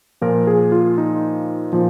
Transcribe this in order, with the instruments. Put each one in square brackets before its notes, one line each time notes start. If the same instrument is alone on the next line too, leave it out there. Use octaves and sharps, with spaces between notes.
[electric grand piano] A#2 F3 A#4
G#4
F4
D#4
A#2 F3